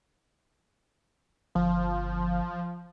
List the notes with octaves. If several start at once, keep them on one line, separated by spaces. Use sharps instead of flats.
G1 F3